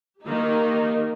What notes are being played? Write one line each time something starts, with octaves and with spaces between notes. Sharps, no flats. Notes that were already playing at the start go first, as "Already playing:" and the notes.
D#3 A#3 D#4 G4